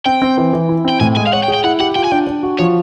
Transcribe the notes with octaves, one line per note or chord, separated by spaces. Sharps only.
C4 G5
C4
E3
E3
E4
C4 G5
A2 G#5
G#3 G#5
F5
C#5 F#5
G5
G#4
G5
E4 F#5
G4 F#5
F4 G5
G#5
D4 G5
D4
F#4
F3 C#5